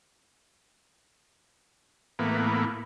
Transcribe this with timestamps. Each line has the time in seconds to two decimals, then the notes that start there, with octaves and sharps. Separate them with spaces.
2.19 A2 E3 A#3 B3